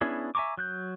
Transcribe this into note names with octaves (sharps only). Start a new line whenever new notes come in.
B3 C#4 D4 E4 G#4
E5 G#5 A#5 C#6 D6
F#3 F#6 G6